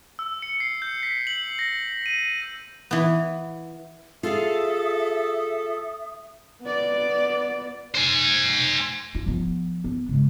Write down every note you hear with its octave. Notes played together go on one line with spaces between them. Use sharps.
E6
C#7
C7
G6
B6
F#7
A#6
D#7
E3 B3
F4 G#4 A4 E5 D#6
B3 D5
C5 G#5
F4
F3 B3
B3
C#3 G#3